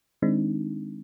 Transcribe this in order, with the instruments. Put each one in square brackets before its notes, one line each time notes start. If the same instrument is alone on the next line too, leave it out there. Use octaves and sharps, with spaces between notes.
[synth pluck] D#3 G#3 C4 D4 D#4